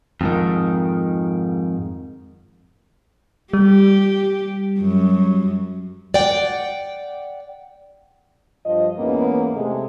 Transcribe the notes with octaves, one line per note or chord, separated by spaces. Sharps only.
F2 G#2 D#3
G3 G4
F#2
D5 F#5 G5
G2 F3 D#5
E2 G#2 E3 A#3 B3 C#4
C3 G#3 A3